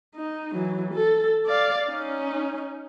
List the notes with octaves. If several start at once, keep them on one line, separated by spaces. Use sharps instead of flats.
D#4
E3 F#3
A4
D5 F5
C#4 D#4